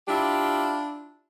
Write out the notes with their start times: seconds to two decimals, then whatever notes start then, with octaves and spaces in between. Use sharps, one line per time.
0.08 D4 E4 F4 G4